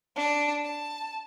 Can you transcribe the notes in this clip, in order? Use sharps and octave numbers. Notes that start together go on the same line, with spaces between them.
D4
A5